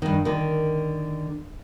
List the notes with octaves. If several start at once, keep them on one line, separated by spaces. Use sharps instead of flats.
G2 D#3
D3 D#3 A#4